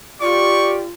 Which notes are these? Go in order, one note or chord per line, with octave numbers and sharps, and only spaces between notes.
F4 G4 D5 C#6